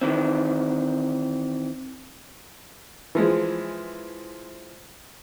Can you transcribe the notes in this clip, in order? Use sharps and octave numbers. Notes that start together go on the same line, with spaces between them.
D#3 E3 C4
E3 F3 G#3